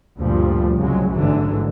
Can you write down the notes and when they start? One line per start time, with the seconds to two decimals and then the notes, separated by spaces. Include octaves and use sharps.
0.19 D2 G2 A#2 F3 G3
0.78 C2 C#3 F#3 G#3
1.11 A1 G#2 D3 E3 F#3